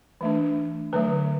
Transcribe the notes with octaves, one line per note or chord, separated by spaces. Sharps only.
E3 A3 D4
D3 F#3 A3 B4